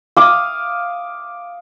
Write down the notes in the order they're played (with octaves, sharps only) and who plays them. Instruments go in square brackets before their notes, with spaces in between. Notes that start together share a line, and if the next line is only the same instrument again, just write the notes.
[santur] F5 D6 D#6